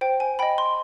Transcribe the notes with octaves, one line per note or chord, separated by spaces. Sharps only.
C5 G5
G#5
D#5 G5 B5
C6